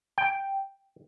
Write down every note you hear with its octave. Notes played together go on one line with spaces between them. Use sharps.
G5